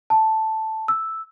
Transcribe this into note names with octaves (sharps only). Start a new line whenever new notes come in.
A5
E6